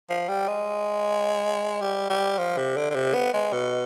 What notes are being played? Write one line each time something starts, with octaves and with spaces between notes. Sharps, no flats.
F3
G3
G#3
G3
G3
F3
C3
D3
D3
C3
B3
G#3
B2